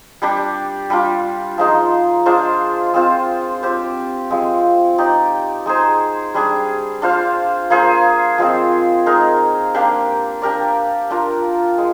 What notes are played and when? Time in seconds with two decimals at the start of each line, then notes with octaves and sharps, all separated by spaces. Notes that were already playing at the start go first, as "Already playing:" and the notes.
0.22 G3 D4 G4 D5
0.90 G3 D4 F4
1.58 F3 G#3 D#4
2.26 G#3 D4 F4 C5
2.94 G#3 C4 F4 C5
3.63 C4 G4 C5
4.31 F3 G#3 C4
4.98 D#4 G4 D5
5.66 G#3 D#4 G#4 C5
6.34 G3 D4 G#4
7.02 D4 F4 C5 F5
7.70 A#3 F4 G#4 C5
8.38 F3 G#3 C4
9.06 G#3 D#4 A#4
9.74 A#3 D4 G4
10.42 D4 G4 A#4 D5
11.10 D4 F4 A#4
11.78 G#3